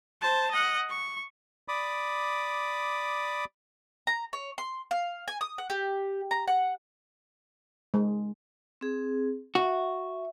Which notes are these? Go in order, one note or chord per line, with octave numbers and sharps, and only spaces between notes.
C5 A5
D#5 F#5
C#6
D5 B5 D6 D#6
A#5
C#5
C6
F5
G#5
D#6
F#5
G4
A#5
F#5
G#3
C4 G#4
F#4 E5